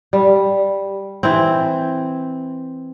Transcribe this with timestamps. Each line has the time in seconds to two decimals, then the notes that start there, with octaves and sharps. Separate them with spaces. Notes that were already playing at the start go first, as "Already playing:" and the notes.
0.13 G3
1.23 E3 C4